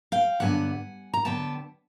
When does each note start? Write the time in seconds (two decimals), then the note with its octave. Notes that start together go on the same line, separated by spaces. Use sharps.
0.12 F5 G5
0.40 G2 D3 F#3 B3 F#5 G#5
1.14 A#5
1.25 D3 F#3 B3 G5 A5